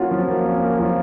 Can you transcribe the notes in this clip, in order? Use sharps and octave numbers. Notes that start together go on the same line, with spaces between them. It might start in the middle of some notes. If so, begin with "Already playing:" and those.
Already playing: A#3 C#4 F4 F#4
F3
A#3
C#4
A#3
F3